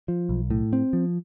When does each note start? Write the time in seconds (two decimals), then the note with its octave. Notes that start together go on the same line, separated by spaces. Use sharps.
0.08 F3
0.29 B1
0.50 A2
0.73 C4
0.93 F3